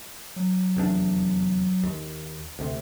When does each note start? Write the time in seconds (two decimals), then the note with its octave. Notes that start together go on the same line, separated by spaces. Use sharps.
0.36 F#3
0.76 F1 E2 D4
1.83 D#2
2.59 D2 C3